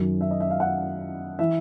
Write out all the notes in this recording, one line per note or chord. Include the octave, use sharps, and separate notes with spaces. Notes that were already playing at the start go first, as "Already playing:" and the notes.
Already playing: F#2 D#3 F#3
E5
D#5
E5
F5
F#5
E3 E5